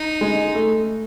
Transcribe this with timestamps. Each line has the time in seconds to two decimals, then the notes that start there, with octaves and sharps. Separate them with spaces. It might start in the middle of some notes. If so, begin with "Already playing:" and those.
Already playing: D#4
0.21 G#3
0.55 A3